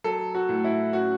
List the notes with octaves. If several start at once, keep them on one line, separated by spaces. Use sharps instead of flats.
F#3 A4
F#4
A2
E4
C#4 F#4